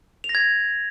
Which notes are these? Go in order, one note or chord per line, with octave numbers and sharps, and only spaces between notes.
F7
A#6
G#6